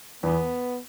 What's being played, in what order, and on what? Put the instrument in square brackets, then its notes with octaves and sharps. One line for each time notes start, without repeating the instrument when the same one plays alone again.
[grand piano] E2 [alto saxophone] B3